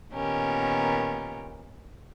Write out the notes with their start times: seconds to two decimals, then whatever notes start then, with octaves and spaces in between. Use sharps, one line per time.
0.12 A#2 D#3 B3 C#4 G4 A#4